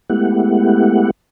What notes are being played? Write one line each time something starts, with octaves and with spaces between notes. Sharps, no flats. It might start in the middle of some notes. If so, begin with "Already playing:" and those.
G#3 A3 B3 E4 G4 F#5